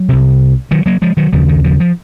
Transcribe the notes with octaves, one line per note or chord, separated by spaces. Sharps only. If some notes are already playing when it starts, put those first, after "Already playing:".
Already playing: F#3
C2 C3
D#3 F#3
F#3 A#3
F3 G#3
D#3 F#3
D#2 C#3 F3
D#3
F3
F3